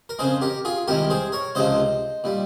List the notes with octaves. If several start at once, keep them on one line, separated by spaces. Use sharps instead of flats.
A#4
F2 C#3 G#3 G#4 C5
G4 A#4
F4 G#4
C2 C3 D#3 G#3 G4 A#4
G#4 C5
A#4 C#5
C#2 C3 F3 G#3 C5 D#5
A#2 G3